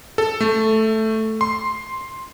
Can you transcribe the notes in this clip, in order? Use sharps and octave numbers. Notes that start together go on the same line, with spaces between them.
A4
A3
C6